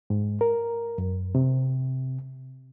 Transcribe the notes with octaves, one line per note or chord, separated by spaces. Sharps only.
G#2
A#4
F#2
C3